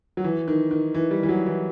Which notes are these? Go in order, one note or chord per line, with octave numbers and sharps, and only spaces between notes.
F#3
E3
D#3
D#3
E3
G3
E3
F#3
E3